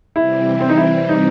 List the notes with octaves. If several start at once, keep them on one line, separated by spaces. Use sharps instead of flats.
C3 E3 G3 C4 E4
C4
D#4
E4
D#4